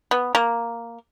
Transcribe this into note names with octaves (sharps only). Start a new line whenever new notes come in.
B3
A#3